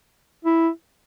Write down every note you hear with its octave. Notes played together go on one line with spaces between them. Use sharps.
E4